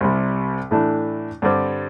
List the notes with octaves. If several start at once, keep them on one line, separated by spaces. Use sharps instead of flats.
C2 C3 G3
A2 E3 A3 D4
G2 D3 G3 C4